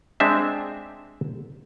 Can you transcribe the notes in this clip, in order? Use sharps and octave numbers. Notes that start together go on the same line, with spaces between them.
G#3 C4 D4 E5